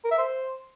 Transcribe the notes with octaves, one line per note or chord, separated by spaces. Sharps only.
A#4
E5
C5